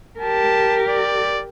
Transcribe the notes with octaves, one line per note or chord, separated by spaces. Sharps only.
G4 A#4 A5
D5